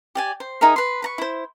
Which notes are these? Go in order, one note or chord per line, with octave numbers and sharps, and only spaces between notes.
G4 D5 G#5
C5
D#4 G#4 A#4 E5
B4 C6
B4 A#5 C#6
E4 C5